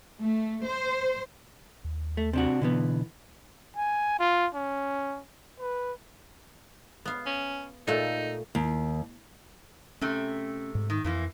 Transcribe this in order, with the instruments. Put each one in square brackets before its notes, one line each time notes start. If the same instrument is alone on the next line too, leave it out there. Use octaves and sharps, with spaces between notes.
[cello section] A3
C5
[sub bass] D#2
[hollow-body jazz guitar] A3
C3 D4 F#4
[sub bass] B2 [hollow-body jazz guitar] D3 E3 B3
[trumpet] G#5
F4
C#4
B4
[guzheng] B3 F5
[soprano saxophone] C#4
[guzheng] A#2 A3 [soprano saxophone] D#4
[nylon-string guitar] D#2
[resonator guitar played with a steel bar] C3 A3 [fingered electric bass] C#4
[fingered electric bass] G#2
[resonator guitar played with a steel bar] D#3
[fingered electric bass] F2 [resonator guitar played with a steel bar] A#2 E3 A#3